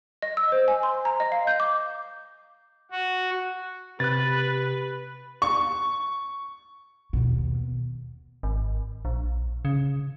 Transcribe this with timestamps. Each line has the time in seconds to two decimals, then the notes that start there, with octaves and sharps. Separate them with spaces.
0.22 D#5
0.37 E6
0.52 C5
0.68 G#5
0.83 C6
1.05 A#5
1.20 D#5
1.32 F5
1.47 G6
1.60 D6
2.91 F#4
4.00 C3 G4 B4 F#6 A6
5.42 C#6
7.13 D#2 B2
8.43 G#1
9.05 A#1
9.65 C#3